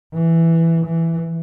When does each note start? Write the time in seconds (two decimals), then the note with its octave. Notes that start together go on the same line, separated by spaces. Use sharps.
0.13 E3
0.85 E3